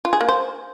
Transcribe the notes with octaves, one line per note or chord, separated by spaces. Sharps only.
F4
G#4
A#3
C5